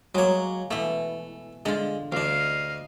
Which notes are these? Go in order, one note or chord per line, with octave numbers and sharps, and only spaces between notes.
F#3 G#3 A#3 C#5
B2 E3 A3
D3 G#3 F4
D2 D4 D#5 F5